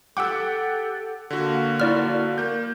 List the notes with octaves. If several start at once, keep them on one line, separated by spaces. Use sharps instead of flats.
G4 A4 F#5 G5 D6 E6
D3 A#3 F#4
E4 D5 F6
A#3 G6